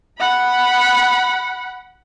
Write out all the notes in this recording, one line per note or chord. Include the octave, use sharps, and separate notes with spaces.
F#5 B5